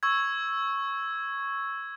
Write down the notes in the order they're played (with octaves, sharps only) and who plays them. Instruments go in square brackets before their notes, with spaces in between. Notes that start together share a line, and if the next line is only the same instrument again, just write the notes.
[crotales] C#6 E6 G#6